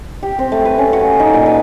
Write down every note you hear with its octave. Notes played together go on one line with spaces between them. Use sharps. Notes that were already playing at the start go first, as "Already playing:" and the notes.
G4
C4
A3
B4
C#4
F#4
A#3
D#4
A#2
B4